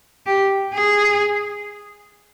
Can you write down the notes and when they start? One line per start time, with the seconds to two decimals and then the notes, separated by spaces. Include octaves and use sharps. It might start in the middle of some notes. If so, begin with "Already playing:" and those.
0.26 G4
0.74 G#4